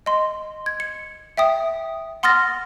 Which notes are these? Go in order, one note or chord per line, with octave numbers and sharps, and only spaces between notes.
D#5 C6
G#6
C#7
E5 G5 D#6
F#5 C6 D#6 F6 A6 A#6